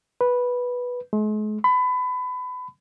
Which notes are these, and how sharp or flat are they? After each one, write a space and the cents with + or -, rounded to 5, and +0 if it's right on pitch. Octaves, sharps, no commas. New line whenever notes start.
B4 -10
G#3 +45
B5 +25